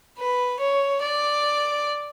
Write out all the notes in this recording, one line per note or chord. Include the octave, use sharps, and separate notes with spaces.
B4
C#5
D5